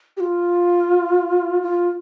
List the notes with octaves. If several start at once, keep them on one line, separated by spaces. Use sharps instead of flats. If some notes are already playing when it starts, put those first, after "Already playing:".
G4
F4
F4